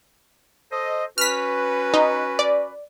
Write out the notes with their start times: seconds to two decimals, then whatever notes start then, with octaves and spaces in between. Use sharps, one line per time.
0.71 A4 C5 D#5
1.18 C#4 F#4 B4 F6 B6
1.94 D#4
2.39 D5